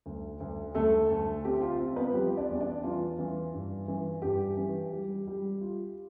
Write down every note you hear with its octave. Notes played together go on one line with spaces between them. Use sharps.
D2
D2
D2 A3 A4
D2
C4 G4
F4
C4
B3 B4
F3 G4
D4 D5
E2
D4 D5
E3 F4
E3
G2
E3
G2 G4
E3
G3
G3
F4